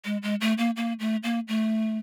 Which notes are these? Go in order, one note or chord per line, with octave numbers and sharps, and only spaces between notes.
G#3
G#3
A3
A#3
A#3
A3
A#3
A3